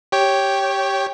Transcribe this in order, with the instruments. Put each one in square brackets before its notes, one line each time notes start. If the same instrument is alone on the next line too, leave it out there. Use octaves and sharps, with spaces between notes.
[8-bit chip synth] G4 C#5 G5